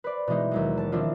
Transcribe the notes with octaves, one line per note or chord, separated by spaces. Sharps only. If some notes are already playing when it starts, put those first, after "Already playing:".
B4 C5 D5
B2 E3 G#3 D#4
D#2 F#3 G#3
A5
D#3 F3 C4 D4 E4 F4